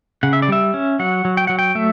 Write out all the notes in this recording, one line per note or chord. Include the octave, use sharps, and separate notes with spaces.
C#3 F#5
E5
D5
G3 E5
C#4
F#3 F#5
F#3
G5
F#3 F#5
G5
A3 E5